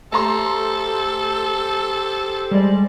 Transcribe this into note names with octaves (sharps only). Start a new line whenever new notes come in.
A3 G4 A4 C5 A#5 C6
G3 G#3 D5